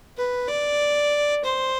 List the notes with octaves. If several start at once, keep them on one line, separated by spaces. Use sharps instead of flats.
B4
D5
C5